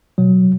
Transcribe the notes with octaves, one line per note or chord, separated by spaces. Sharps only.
B2 F#3